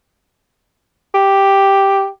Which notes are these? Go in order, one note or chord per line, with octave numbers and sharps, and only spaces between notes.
G4